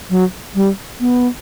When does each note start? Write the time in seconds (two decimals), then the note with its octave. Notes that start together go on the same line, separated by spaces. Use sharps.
0.10 F#3
0.55 G3
1.00 B3